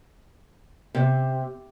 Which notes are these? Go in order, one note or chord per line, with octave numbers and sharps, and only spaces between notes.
C3